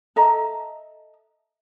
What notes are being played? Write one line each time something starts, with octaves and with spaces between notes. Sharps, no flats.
A4 D#5 E5 A#5